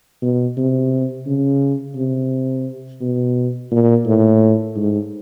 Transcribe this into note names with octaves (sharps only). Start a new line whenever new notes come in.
B2
C3
C#3
C3
B2
A#2
A2
G#2